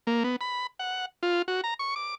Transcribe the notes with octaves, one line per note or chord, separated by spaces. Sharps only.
A#3
B3
B5
F#5
F4
F#4
A#5
C#6
D6